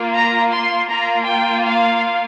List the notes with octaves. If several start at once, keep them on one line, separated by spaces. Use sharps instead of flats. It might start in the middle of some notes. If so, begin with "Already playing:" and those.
Already playing: A#3 F4
A#5
C6
A#3 F4 A#5
G5
F5